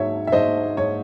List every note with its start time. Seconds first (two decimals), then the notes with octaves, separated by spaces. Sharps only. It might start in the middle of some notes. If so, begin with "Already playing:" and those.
Already playing: G#2 F#3 C#5 E5
0.27 E5
0.32 G#2 C5 D#5
0.77 G#2 C#5